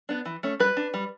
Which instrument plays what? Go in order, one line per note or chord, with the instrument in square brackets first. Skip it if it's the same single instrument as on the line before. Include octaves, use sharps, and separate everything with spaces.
[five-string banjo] B3 D4
E3
A3 C#4
G3 B4
D4
G3